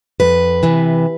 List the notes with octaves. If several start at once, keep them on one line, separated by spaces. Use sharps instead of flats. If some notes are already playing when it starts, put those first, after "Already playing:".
F2 B4
C3 E3